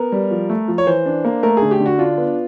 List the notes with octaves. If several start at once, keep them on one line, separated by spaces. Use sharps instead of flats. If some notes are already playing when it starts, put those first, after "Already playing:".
Already playing: B3 A#4
G3
F3
A3
F3
C#5
E3 C5
D4
A#3
A3 A#4
D3 G#4
G4
D3
F#4
D4 F4
B3